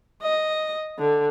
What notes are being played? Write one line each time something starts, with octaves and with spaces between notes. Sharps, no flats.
D#5
D3